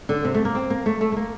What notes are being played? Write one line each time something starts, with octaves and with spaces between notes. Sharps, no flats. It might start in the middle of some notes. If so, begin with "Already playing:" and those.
D3
C3
A3
A#3
C4
A#3
A3
A3
A3
A#3